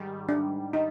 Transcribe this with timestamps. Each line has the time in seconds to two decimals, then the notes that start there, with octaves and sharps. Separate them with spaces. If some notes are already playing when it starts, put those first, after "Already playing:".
Already playing: G#2 D#3 G3
0.28 G#2 D4
0.73 G3 D#4